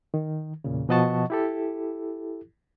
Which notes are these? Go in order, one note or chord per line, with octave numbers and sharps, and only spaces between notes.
D#3
E2 A#2 C#3
B2 F3 D#5 F#5 A5 C#6
E4 G4 A4